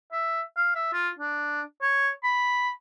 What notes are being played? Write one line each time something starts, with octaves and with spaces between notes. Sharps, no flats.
E5
F5
E5
F4
D4
C#5
B5